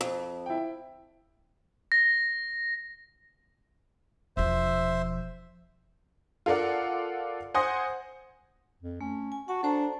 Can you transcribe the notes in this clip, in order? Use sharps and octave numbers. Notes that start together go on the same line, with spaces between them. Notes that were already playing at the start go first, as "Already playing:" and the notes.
F2
E4 G5
A#6
E1 F3 C5 E5
F4 A4 A#4 D5 F#5
C5 F#5 G#5 C6 D#6 A#6
F2
A3 C#4
G#5
F#4 F#5 A5
D4 A4 C5 A#5